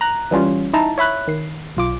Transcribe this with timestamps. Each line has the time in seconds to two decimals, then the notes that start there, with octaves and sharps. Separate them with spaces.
0.01 A#5 F#6
0.31 E3 G3 C#4 F4
0.73 D#4 E4 A5 A#5
0.98 C#5 E5 B5 F#6
1.28 D#3 C7
1.77 B1 F4 D6